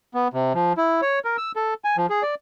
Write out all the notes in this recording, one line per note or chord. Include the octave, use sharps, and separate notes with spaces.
B3
C3
F3
E4
C#5
A#4
E6
A4
G#5
F3
G#4
D5